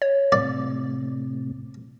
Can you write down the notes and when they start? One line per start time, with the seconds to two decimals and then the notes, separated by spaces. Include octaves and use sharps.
0.02 C#5
0.32 A2 C3 D5